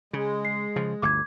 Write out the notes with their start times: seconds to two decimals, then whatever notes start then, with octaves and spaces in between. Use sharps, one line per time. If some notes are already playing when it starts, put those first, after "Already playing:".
0.13 C#3 G#3
0.45 C7
0.76 C#3 F3
1.02 G1 D2 D6 G#6